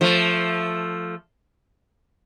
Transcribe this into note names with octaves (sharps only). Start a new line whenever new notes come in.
F3 A3